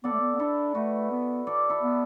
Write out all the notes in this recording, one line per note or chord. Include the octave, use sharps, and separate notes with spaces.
B3 A4 D5
A3
B3
B3
D4 E4 A4
A3 F#4 B4
B3
A4 D5
E4 A4
B3